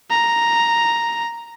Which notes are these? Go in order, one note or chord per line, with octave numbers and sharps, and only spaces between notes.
A#5